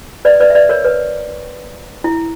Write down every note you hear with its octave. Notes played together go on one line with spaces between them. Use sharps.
B4 D5
B4 D5
E5
B4 D5
A#4 C#5
B4
E4